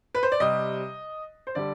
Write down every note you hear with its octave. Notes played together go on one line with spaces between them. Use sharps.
B4
C5
D5
C3 G3 D#5
C5
D3 G3 D5